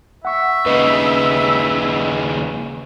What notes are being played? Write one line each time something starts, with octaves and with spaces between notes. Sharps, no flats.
E5 F#5 C#6
D#2 C#3 B4 D#5